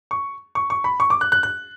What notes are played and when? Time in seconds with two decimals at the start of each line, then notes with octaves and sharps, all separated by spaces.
0.11 C#6
0.55 C#6
0.70 C#6
0.84 B5
1.00 C#6
1.10 D6
1.21 F#6
1.32 F#6
1.43 F#6